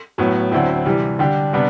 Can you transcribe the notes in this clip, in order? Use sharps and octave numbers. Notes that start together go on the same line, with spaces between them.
A2 F#3 B3
D2 D3 F#3 C4 E4
C3 E3 G3
D3 G3 D4 G4
C3 G3 B3 D4